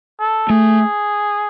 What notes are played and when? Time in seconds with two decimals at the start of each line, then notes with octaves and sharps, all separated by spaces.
0.20 A4
0.50 A3 G#4